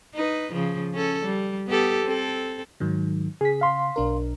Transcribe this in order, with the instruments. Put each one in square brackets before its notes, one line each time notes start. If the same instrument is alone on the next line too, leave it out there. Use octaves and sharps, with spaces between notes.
[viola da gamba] D#4 B4
C#3 F3
C#4 A4
G3
B3 G4 A4
C4 A4
[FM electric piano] G#2 D#3 F#3
[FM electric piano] C#3 B6 [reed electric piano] G#4
[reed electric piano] F5 C6
[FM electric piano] B1 D4 A#4